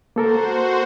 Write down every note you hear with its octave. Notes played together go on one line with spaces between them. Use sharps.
A#3 F#4 A4 A#4 C5